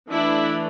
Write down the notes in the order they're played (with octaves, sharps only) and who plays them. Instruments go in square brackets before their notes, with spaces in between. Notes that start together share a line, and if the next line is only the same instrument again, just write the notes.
[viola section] E3 A3 D4 E4